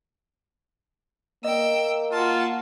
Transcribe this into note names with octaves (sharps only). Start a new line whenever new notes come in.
A#3 D#5 G5 E6
F4 F#4 A5